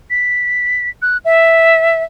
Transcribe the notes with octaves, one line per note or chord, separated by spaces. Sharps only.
B6
F#6
E5